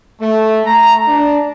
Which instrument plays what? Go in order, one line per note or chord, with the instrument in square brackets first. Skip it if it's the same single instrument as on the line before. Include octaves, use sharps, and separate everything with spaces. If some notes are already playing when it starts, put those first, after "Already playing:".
[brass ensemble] A3
A#5
D4